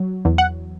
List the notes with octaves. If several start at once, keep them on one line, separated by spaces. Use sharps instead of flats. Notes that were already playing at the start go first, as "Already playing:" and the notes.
Already playing: F#3
E2
F#5